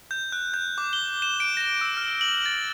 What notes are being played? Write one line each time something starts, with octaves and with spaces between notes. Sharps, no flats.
G6
F#6
G6
D6
G7
E7
D7
A#6
E6
F6
F#7
A6